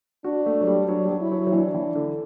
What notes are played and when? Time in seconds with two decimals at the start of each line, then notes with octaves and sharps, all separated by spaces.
0.24 D4 F#4
0.46 A3
0.61 F#3
0.67 G3
0.88 F#3 D4
1.05 G3
1.10 F#3
1.21 E4
1.32 F#3
1.47 F#3
1.52 E3 D4
1.74 E3
1.95 D3